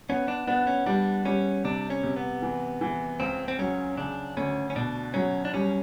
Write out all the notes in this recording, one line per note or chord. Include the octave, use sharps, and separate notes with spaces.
B3 C#4
D4
B3 D4
C#4
G3 D4
G3 C#4
C3 D4
C#4
C3
B3
E3
E3
C#2 C4
C4
F#3 C#4
C#3 D4
D2 C#4
C#4
B2 D4
F#3 C#4
D4
G3 C#4